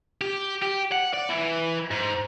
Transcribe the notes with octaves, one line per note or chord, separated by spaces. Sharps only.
G4
G4
F#5
D5
E3
G#2